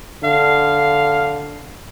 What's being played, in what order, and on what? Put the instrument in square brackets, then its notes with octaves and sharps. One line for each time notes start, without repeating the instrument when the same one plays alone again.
[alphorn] D3 [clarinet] F5